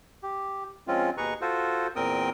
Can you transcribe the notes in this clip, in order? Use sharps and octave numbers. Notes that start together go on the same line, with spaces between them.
G4
F3 G#3 C4 C#4 F4
D#2 B2 G#4 B4 A#5 C#6
F4 F#4 A4 C5
E2 A#2 C4 A#4 G5 D#6